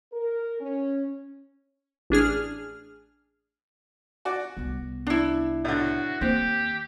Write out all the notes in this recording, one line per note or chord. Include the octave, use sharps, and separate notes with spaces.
A#4
C#4
A1 D4 G#4 F6
F#4 D5
C2 B3
D4 E4
A2 D3 F#4
D#2 A#3 C4 G4